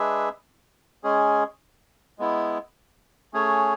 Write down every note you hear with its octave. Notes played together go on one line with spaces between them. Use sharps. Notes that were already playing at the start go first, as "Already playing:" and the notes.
Already playing: G#3 D4 G#4 B4 E5
G#3 C#4 G#4
G#3 B3 E4
A3 C#4 G#4 C#5